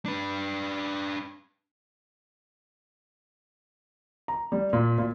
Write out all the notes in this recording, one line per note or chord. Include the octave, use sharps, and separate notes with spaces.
D4 B4
A#5
G3
A#2
A#2